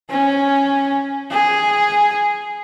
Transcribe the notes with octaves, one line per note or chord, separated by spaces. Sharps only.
C#4
G#4